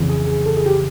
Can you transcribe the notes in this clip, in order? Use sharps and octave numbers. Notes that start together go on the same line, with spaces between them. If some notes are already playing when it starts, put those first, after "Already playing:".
Already playing: F2 C#3 E3
G#4
G#4
A4
G#4
G4